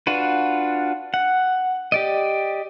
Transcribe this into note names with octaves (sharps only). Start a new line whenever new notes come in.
D4 F4 F#4 B4
F#5
G4 D5 D#5